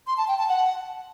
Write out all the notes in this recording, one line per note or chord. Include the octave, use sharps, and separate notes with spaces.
C6
A5
G5
A5
F#5